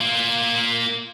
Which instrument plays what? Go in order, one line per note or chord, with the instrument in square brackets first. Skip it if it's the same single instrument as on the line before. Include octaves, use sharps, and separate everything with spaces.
[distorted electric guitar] A#3 F4